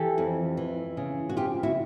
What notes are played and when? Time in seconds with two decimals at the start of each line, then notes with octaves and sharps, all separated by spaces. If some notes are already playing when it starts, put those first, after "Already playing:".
Already playing: E3 G4 A4
0.18 F2
0.57 E3
0.97 C#3
1.29 F#4
1.37 F2 F4 G4
1.63 E4 F#4